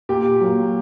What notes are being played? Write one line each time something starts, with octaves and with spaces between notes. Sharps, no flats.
A#2 G4
F#3 A#3